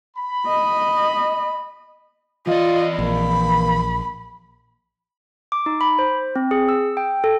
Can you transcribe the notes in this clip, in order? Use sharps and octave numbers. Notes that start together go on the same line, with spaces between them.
B5
D#5
E3 F4 D5 D#5
A#1 A#3 B5
D6
D#4
B5
C5
C4
G#4
E6
G5
A4